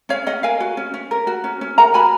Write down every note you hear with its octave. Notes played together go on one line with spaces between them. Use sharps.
C#4 C#5 F5
C#4 D#5 F#5
A#4 F5 G#5
F#4
C#4
C#4
A#4
F#4
C#4
C#4
A#4 F#5 A#5
F#4 G#5 B5